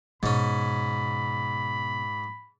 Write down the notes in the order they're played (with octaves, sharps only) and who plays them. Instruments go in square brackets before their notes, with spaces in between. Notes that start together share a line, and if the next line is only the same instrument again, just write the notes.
[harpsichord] G#2 C#4 [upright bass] B2 [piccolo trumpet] B5